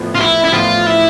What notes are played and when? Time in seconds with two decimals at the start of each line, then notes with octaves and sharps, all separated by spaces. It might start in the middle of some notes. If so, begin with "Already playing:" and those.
Already playing: A1 A2 F3 B3
0.15 F4
0.21 E4
0.44 E4
0.53 A1 A2 F3 B3 F4
0.87 E4